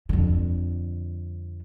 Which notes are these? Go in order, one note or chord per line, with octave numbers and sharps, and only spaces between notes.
F2 D3